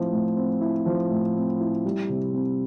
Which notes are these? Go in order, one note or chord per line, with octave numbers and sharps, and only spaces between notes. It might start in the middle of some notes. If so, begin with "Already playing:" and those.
Already playing: A2 F3 C4 E4
A2
C4
E4
F3
A2
C4
E4
G3
C3
C4